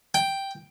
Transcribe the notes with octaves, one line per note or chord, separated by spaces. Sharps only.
G5